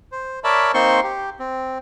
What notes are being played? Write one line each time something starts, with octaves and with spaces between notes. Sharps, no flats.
C5
A#4 C#5 D5 E5 A5 B5
A#3 C4 D#4 C5 C6 C#6
G4
C4